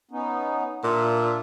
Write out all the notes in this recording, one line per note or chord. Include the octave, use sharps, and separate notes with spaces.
B3 C#4 D#4
A#2 D4 F4 E5